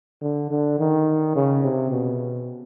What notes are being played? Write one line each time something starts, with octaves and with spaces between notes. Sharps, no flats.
D3
D3
D#3
C#3
C3
B2